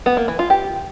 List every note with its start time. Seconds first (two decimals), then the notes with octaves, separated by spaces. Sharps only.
0.06 B3
0.17 A#3
0.28 E3
0.39 F4
0.50 G4